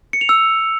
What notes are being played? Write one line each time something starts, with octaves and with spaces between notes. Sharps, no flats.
C#7
F7
E6